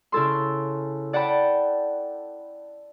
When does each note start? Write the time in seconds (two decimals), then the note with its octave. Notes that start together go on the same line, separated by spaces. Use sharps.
0.12 C#3 E4 A4 C6
1.13 D5 F#5 G5 A5 B5